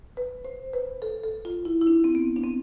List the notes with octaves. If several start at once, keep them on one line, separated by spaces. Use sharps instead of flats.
B4
C5
B4
A4
A4
F4
E4
E4
D4
C4
B3
D4
C4